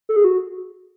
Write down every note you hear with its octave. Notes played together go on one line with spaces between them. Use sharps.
A4
G#4
F#4